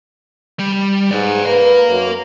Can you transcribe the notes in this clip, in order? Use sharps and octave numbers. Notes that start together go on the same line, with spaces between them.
G3
G#2 B4 D5
A#4 B4 F5
F#2